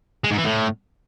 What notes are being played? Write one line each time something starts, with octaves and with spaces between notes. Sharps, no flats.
G#3
G#2
E3
A2